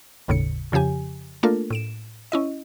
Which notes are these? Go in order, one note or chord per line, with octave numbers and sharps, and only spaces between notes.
G1 D#2 A2 C#3 C#7
F2 C#3 F3 G4 G#5
A3 A#3 D4 F4 A4 A#4
A2 D7 E7
C#4 E4 D#5